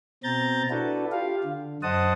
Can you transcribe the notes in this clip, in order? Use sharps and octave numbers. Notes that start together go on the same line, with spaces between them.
B2 C4 A#5 G6 A6
D4 E4 F#4 A4 B4
F4 G4 F5
D3
F#2 C5 D#5 F#5 A5 D#6